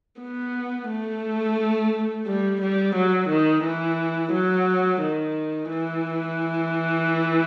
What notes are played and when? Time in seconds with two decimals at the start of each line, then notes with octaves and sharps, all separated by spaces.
0.21 B3
0.89 A3
2.26 G3
2.61 G3
2.95 F#3
3.29 D#3
3.64 E3
4.32 F#3
5.01 D#3
5.69 E3